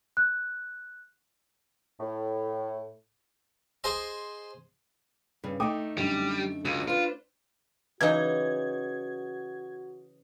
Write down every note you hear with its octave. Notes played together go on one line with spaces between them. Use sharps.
F#6
A2
G#4 C5 D#5
G2 C#3
A3 D#4 G5 D6 D#6
F#2 D3 G3
C#2 F#4
D4 F4 B4 C5
C#3 E3 F#3 D#4 F#4 G#6